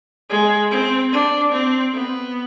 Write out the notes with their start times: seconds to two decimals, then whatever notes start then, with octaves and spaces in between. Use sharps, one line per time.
0.30 G#3
0.71 C4
1.12 D4
1.52 C4
1.93 B3